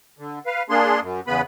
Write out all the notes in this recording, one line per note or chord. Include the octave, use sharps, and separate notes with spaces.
D3
B4 F5
A#3 D4 G#4 C6
F#2
E2 C#3 B3 B4 B5